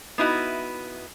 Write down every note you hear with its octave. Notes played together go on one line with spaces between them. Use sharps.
B3 D#4 E4 F#4